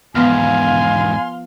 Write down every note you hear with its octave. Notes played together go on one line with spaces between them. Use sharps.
E2 G#2 F3 B3 F5 G#5 C6 F6